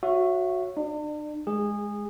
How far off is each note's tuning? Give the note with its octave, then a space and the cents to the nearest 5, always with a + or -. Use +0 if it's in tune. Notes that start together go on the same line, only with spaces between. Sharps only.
F#4 -10 C#5 -5 E5 +25
D4 +45 D5 +30
G#3 +0 G#4 -20